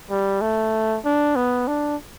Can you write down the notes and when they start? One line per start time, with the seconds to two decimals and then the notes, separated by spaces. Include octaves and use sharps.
0.10 G3
0.41 A3
1.05 D4
1.36 B3
1.68 D4